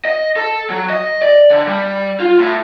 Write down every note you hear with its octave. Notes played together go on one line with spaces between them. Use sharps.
D#5
A4
F#3
D#5
D5
D3
G3
F4
A2